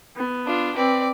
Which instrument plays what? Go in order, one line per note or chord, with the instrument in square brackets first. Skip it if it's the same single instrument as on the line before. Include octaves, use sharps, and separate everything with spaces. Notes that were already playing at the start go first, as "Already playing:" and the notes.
[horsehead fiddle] B3
[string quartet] D4 F4
[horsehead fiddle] C4 [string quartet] B4 D5